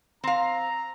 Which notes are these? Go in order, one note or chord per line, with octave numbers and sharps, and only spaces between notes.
C4 F5 A#5